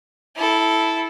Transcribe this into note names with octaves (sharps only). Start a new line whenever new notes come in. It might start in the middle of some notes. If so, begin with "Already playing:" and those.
E4 A4